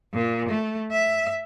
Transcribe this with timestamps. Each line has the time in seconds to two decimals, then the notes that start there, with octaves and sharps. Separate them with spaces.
0.14 A#2
0.49 A3
0.91 E5